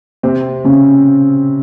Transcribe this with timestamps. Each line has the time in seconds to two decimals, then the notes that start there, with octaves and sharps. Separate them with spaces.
0.23 C3 C4
0.64 C#3 C#4